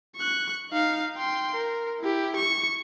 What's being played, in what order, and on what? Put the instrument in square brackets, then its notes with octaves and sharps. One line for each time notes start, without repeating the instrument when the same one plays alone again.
[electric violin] C#6 F#6
D#4 F5
G5 C6
A#4
E4 G4
C#6